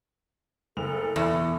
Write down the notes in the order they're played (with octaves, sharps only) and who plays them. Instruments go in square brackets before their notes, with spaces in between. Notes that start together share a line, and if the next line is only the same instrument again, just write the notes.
[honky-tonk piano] F#1 F7 [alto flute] A4
[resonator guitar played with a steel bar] E2 [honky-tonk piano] B2 E3 E4